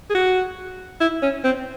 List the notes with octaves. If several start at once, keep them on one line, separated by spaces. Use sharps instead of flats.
G#4
F#4
E4
C#4
C4